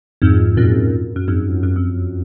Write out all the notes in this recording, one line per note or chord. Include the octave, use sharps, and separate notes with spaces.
F2 G#2
F#2 A#2
F#2
F2 G#2
F#2
F2